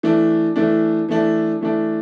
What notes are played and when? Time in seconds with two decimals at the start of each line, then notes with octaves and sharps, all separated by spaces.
0.03 E3 A3 D4
0.56 E3 A3 D4
1.09 E3 A3 D4
1.61 E3 A3 D4